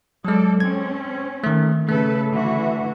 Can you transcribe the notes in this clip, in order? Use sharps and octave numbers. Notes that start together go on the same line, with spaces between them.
F#3 G#3 A4 D5
C4 C#4 G#6
D#3 A3
C#3 A3 A4 B4
D3 E3 F#4